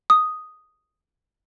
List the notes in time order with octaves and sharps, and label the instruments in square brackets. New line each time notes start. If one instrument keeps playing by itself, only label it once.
[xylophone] D#6